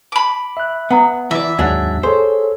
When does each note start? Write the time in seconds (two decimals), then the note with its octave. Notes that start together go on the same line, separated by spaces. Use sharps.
0.12 B5 D6
0.57 E5 F#6
0.91 B3 F#5 A#5 D#6
1.31 E3 E4 D5 E5
1.59 D#2 G#2 F#3 D4 D5
2.03 G#4 A4 C5 C#5